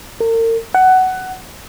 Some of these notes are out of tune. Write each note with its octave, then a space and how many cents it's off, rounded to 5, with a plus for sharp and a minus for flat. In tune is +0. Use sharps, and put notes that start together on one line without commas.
A#4 -40
F#5 +15